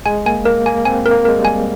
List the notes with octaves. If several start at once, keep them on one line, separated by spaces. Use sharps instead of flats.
G#3 G#5
A#3 G#5
A#3 A#4
A#3 G#5
C4 G#5
A#4
A#3
G#3 A#4
G3
G#5